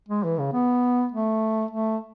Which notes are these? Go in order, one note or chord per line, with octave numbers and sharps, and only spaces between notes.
G#3
E3
C#3
B3
A3
A3